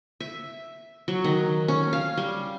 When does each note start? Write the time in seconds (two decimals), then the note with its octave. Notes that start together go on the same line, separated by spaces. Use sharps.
0.20 E5
1.08 F#3
1.24 D#3
1.68 C#4
1.93 F5
2.17 G3